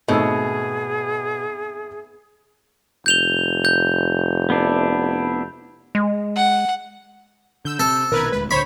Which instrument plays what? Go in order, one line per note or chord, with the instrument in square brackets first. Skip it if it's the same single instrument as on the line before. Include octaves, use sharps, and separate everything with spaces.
[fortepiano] G#1 D#4 E6 [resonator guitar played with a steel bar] B2 [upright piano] A3 [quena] G#4
[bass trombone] F1 [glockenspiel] G6 F7 G7
[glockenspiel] G6
[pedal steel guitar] B3 D4 E4
[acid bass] G#3
[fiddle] F#5
[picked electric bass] D3 [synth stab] E6 G6
[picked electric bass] C3 [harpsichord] A4
[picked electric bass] A#1 B2 D#3 [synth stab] A#4 B4 G#6
[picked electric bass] D#1 D2 G#3 [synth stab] B4
[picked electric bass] C#2 D3 [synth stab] C5 C#5 C#6 [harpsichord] B5